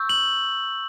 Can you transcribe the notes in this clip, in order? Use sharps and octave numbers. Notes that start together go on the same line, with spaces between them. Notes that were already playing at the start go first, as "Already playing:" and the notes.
Already playing: C#6 E6 G6
F#7